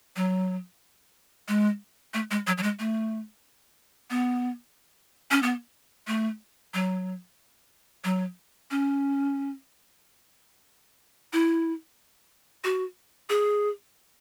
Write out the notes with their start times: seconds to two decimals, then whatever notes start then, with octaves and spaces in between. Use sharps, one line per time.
0.16 F#3
1.48 G#3
2.14 A3
2.31 G#3
2.47 F#3
2.58 F#3
2.63 G#3
2.79 A3
4.10 B3
5.31 C#4
5.43 B3
6.07 A3
6.74 F#3
8.04 F#3
8.71 C#4
11.33 E4
12.64 F#4
13.30 G#4